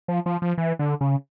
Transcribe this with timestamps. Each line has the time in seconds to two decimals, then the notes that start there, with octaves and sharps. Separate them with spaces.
0.08 F3
0.26 F3
0.42 F3
0.58 E3
0.79 D3
1.01 C#3